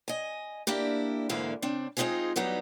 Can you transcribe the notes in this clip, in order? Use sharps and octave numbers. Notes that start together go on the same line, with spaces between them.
D#5 G#5
A#3 D4 E4 G4
D2 G#2 D3 E3 A#3 F5
C#3 C4 D4
G#3 C4 C#4 D#4 F4 G#4
E3 F#3 G3 B3 D#4